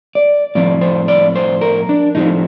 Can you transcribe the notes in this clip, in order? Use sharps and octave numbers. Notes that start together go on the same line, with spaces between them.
D5
A2 F3 C4 D5
C5
D5
C5
A#4
D4
A2 F3 C4 D#4